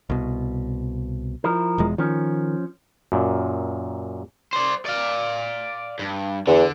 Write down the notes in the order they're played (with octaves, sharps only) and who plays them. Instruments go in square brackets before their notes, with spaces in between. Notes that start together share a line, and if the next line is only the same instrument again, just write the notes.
[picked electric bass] C2 B2
[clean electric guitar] F3 E4 A#4
[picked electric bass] E1 E2 G#3
[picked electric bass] D#3 [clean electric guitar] F3 C#4
[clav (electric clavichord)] F#2 A#2
[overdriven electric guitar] C5 D5
D5 F5
G2
[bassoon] E2 [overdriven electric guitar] D3